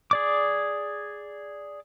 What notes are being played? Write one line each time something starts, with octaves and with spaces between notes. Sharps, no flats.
G#4 D5 D6